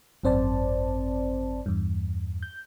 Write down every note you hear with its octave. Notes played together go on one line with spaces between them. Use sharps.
G#1 F#2 C4 C5 D5 A5
E2 G2
G6